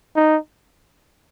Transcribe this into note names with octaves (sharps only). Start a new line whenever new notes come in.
D#4